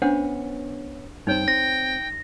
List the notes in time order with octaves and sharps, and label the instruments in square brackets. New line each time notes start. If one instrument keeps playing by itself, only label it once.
[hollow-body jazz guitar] B3 C#4 [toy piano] D4 C5 F#5
[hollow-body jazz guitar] G2 C4 [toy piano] D#4 C#5 [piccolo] G5
[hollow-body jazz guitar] C4 [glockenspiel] A#6